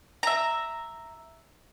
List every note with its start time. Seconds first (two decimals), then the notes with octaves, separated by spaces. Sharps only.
0.23 E5 A#5